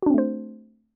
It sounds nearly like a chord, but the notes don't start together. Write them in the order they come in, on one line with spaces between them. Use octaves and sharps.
F#4 D4 C4 A3 C5